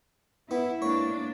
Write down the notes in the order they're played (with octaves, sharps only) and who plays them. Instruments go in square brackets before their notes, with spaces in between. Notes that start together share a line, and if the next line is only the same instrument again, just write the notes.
[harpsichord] B3 [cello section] E4
[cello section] G#2 A#3 D4 [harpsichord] C#5